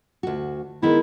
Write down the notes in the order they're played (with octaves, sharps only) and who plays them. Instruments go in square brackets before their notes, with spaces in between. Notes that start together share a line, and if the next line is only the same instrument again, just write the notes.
[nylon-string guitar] D2 F#4
[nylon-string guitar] D#3 G#3 B3 [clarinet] E4